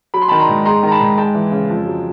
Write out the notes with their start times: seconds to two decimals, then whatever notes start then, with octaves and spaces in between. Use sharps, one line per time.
0.14 F#3 B5
0.22 C6
0.28 D#3 A5 B5
0.39 A#5 C6
0.48 G#2
0.65 G#3 A#5 C6
0.83 D#3 A#5
0.92 A5 B5
1.00 G#2
1.17 G#3 G5 A5
1.34 E3
1.52 C#3
1.69 F2
1.87 F#3